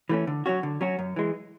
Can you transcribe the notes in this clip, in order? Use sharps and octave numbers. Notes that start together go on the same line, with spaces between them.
E3 A3 C#4
D3
F#3 C#4 F#4
D3
F#3 C#4 F#4
F#2
E3 G#3